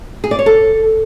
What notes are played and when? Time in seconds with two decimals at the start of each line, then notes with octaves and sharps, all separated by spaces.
0.24 G#4
0.31 D5
0.39 C#5
0.46 A4